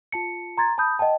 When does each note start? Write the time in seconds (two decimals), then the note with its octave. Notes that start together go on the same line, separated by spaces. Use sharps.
0.12 F4 A5 C#7
0.58 A#5 C6 G#6 A6
0.78 A5 B5 D#6 G6
0.99 D#5 F#5 G5 A5